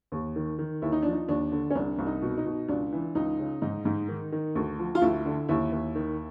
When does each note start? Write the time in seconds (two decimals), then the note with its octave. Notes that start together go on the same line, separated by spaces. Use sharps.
0.12 D#2
0.36 D#3
0.58 D#3
0.82 D#2 E4
0.92 D#4
1.03 F3 D4
1.12 D#4
1.28 D#2 D4
1.52 D3
1.70 C#4
1.75 C2 D4
1.99 C2
2.06 D#4
2.22 B2
2.37 D#4
2.46 B2
2.68 C#2 D4
2.93 E3
3.15 C#2 D#4
3.39 C#3
3.62 G#2 D#4
3.85 G#2
4.08 D#3
4.32 D#3
4.55 D2
4.79 F3
4.95 F4
5.02 D2 E4
5.25 D3
5.49 D#2 E4
5.72 D#2
5.95 D#3